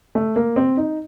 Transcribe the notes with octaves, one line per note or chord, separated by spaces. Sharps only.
A3
A#3
C4
D#4